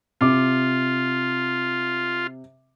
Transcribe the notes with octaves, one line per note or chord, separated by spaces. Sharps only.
C3 F4 D6